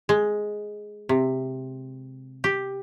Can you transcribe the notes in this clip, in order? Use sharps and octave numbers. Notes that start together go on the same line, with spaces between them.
G#3
C3
G4